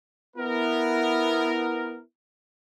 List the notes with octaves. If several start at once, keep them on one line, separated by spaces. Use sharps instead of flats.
B3 E4 A#4